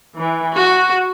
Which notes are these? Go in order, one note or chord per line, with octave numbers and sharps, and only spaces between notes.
E3
F#4